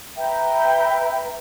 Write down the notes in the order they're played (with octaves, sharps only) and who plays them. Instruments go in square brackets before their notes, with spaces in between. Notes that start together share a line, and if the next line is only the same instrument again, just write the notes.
[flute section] B4 E5 G5 A#5